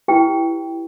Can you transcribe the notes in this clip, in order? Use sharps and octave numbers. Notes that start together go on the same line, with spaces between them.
E4 G4 B4 G5